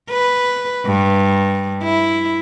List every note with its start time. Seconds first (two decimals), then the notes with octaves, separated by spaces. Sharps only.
0.10 B4
0.86 G2
1.83 E4